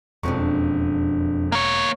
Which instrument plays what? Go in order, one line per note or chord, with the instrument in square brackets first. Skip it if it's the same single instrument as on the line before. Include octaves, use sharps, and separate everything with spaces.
[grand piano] E1 C#6 [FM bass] F2 [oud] D3 C#4 D4
[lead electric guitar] A#3 C#5